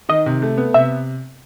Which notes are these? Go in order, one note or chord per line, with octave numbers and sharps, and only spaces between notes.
D#3 D#5
C3
A3
B3
C3 E5